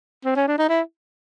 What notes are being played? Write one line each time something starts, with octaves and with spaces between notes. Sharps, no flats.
C4
C#4
D4
D#4
E4